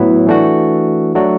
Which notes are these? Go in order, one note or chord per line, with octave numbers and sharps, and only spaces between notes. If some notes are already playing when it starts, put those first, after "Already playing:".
Already playing: A2 F#3 B3 E4
E3 A3 D4 F#4
F#3 A3 D4 F#4